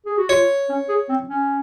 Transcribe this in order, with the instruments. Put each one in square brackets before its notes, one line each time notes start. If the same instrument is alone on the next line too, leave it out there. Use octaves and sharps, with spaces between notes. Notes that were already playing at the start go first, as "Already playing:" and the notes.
[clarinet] G#4
F#4
[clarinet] F4 [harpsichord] C#5
[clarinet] C#4
G#4
C4
C#4